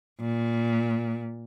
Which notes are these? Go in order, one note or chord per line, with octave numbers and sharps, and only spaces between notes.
A#2